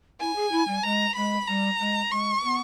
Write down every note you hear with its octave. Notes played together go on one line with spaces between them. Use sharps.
E4 G#5
G#4
E4
G3
G#3 A#5
G#3 B5
G3 A#5
G#3
G#3 C#6
B3